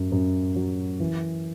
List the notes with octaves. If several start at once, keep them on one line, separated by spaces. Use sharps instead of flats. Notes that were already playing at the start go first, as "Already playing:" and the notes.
Already playing: F#2
F#2
F#3
E3